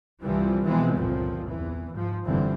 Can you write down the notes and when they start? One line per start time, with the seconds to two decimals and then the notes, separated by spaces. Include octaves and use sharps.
0.22 C2 G2 E3 F3 G3
0.63 B2 E3 F3 G#3 B3 C4
0.94 G1 C#2 A#2 F3 C4
1.48 E2 E3
1.92 G#2 F3
2.25 F1 G2 D3 E3 C4